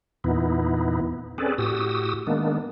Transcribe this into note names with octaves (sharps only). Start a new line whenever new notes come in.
E2 A#2 E3 B3 D#4 E4
C4 C#4 G#4 A4 B4 D5
A2 F#4 G4 D#6 E6
D#3 G#3 A#3 B3 D4